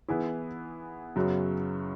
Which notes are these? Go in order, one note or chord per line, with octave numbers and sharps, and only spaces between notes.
E3 B3 E4 G#4
F#2 C#3 F#3 B3